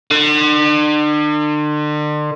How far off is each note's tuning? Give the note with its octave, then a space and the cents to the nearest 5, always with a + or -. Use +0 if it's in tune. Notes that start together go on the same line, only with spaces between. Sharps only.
D3 +40